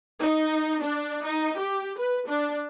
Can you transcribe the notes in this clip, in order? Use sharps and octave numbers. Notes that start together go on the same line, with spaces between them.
D#4
D4
D#4
G4
B4
D4